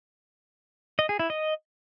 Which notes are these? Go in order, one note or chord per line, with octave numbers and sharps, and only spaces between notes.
D#5
G#4
E4
D#5